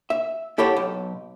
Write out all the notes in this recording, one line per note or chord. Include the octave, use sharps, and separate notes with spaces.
E5
E4 G4 A4 C#5 F#5
B1